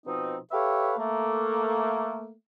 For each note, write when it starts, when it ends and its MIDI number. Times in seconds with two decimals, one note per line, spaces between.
0.06 0.37 47
0.06 0.37 53
0.06 0.37 60
0.06 0.37 63
0.52 0.94 67
0.52 0.94 69
0.52 0.94 71
0.52 0.94 73
0.52 0.94 76
0.52 0.94 77
0.98 2.33 57
0.98 2.33 58